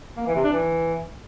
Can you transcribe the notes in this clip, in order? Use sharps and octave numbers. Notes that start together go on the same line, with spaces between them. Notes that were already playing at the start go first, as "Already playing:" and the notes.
A#3
E3
C3
D4
E3